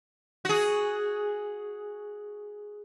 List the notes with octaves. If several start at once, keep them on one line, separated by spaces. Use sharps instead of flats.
F#4 G#4